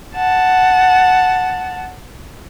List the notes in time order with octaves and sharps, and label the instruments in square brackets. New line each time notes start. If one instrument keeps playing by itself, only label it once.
[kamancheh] F#5 A5